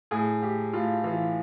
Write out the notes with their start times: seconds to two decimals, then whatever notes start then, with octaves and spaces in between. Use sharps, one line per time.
0.11 A2 G#4
0.42 A2 G4
0.73 A2 F4
1.04 E3 F4